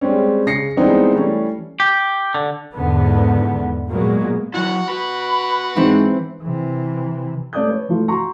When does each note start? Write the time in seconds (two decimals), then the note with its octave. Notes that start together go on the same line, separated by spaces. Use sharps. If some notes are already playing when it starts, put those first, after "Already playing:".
0.01 G3 G#3 C4 C#4
0.47 C#3 A#6 C7 C#7
0.77 E3 G3 G#3 B3 C4 D#4
1.14 E3 G3 A3 C#4
1.80 G4
2.34 D3
2.74 E2 G#2 D3 B3
3.90 A#2 F#3 G#3 A#3 B3
4.54 F#3 E4 F#4 F#5
4.89 F#4 B4 B5
5.76 G#2 E3 C4
6.42 C3 E3
7.53 A3 C#4 D5 D#6 G6
7.68 B4 C#5
7.89 E3 A3 F4
8.08 F#4 A#5 C6 C#6